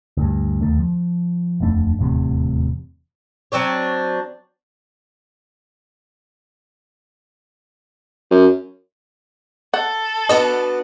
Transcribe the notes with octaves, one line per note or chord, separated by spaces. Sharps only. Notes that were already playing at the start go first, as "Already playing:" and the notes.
D2 G2
D#2 D#3 A3
F3
D#1 F2 A3 D4
D#1 E2 A2 C3
F#3 C4 D4 C#5
F#2
A4 F#5
B3 D4 F#4 D#5